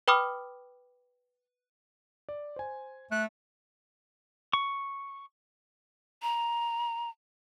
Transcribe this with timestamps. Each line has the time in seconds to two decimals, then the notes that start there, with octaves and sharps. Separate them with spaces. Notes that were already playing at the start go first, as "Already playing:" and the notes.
0.08 B4 G5 B5 D6 D#6 F6
2.29 D5
2.56 C5 G#5
3.12 A3 F#6
4.53 C#6
6.22 A#5